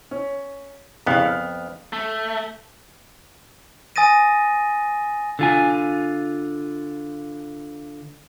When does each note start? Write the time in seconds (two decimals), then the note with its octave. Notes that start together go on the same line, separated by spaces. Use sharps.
0.11 C#4
1.06 C2 F2 C#3 B3 F5
1.25 F6
1.93 A3
3.96 G#5 D#6 A6 A#6 D#7
5.39 D3 F4 G#5